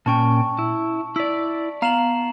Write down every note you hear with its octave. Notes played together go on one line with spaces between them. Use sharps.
A#2 C#4 G5 A5 C#6
E4
E4 D5 B6
B3 F5 A#5 E7 F#7